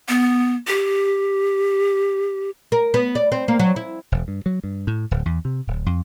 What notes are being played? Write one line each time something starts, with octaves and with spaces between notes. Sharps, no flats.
B3
G4
A#4
B3
D5
C4
A#3
F#3
E4
E1
G2
F#3
G2
A2
D1
E2
C3
D1
F2